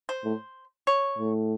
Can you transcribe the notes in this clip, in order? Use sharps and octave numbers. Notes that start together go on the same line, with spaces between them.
C5
A2
C#5
A2